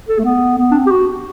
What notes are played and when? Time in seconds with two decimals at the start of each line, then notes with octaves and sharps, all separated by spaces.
0.09 A4
0.19 A3
0.25 B3
0.58 B3
0.71 D4
0.74 C4
0.87 G4
0.91 F#4